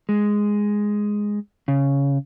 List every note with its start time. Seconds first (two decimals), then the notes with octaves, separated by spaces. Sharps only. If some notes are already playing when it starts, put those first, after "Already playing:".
0.09 G#3
1.68 C#3